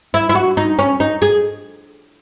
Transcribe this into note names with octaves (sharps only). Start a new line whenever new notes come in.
E4
E4
F#4
D#4
C#4
D#4
G#4